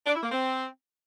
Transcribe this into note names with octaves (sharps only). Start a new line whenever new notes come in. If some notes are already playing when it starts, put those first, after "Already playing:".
D4
E4
A#3
C4